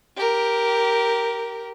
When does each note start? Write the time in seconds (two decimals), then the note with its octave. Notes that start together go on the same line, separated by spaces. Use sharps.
0.16 G4 A#4